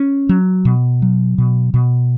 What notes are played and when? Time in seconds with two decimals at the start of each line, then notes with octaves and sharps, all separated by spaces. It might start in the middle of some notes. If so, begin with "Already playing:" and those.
Already playing: C#4
0.29 F#3
0.65 B2
1.02 F#3
1.38 B2
1.74 B2